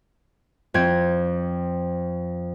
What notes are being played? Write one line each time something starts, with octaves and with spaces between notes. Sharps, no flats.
F2 C4 G#6